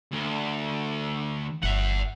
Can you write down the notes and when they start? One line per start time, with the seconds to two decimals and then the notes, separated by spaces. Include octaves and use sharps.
0.12 D2
1.63 G1 E5 F#5